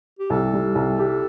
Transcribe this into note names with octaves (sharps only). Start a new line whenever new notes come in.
G4
C2 A4
G3
C2
G4